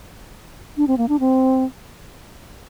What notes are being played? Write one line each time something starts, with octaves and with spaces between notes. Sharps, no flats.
D4
C4
A#3
D4
C4